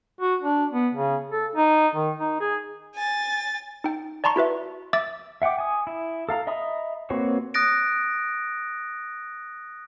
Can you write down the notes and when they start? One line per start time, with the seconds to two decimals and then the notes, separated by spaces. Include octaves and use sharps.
0.21 F#4
0.42 D4
0.72 B3
0.94 C#3
1.31 A4
1.56 D#4
1.95 D#3
2.20 D#4
2.41 G#4
2.95 G#5 A6
3.84 D#4 G5
4.24 D5 A5 A#5 C6 C#6
4.36 E4 F#4 B4 E5
4.93 E5 D6 E6 A6
5.42 E5 F#5 G5 D6
5.59 G#5 D#6
5.87 E4
6.29 A4 F5 A#5
6.47 D#5 E5 A#5 B5 D#6
7.10 A#3 C4 F#4 B4 C#5
7.54 D#6 F#6 A6 A#6 D7